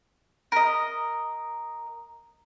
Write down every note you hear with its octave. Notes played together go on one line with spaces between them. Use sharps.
A#4 D#5